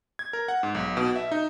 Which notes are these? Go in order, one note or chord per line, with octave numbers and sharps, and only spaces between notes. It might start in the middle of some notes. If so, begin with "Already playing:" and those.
G#6
A#4
F#5
G#2
B1
B2
E5
D#4